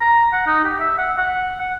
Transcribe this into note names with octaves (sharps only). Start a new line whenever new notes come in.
A#5
F#5
D#4
G4
E5
F#5
F#5
F#5